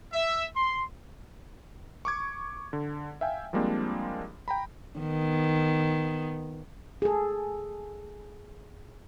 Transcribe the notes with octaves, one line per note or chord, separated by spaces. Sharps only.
E5
C6
C#6 D6 G#6
D3
E5 F5 G5 G#5
F3 G3 G#3 A#3 C4 D4
G5 A#5 B5
D#3 B3
G#4 A4